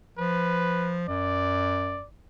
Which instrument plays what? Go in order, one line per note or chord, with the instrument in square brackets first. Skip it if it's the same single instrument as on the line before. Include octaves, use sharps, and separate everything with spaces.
[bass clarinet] F3 [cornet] B4
[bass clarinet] F#2 [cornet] D5